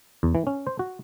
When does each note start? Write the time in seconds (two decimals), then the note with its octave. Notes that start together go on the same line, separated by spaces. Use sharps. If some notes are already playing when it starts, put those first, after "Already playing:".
0.23 E2
0.35 E3
0.47 C#4
0.67 C5
0.79 F#4